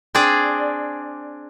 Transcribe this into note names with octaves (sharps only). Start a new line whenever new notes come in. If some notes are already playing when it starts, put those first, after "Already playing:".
C4 D4 G#4 D5